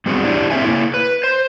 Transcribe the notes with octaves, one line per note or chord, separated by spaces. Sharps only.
G3 B3 C4 F#4 G#4
D4 E4 G4
A#3 C4 G#4 E5 G#5
A#3 E4
B4
C5